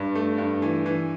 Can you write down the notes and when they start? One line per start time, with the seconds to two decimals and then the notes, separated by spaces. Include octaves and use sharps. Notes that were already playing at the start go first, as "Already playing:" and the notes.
Already playing: G2
0.15 A3
0.38 G2
0.62 E3
0.86 E3